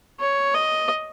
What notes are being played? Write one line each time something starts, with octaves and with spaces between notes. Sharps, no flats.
C#5
D#5